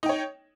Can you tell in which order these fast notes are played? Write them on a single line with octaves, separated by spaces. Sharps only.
D#4 G5 C#5